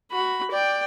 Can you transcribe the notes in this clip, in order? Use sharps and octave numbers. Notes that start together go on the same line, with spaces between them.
F#4 B5
D5 G5